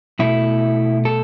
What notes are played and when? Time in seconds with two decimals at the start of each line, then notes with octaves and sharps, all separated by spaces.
0.19 B2 A3 E4
1.05 A4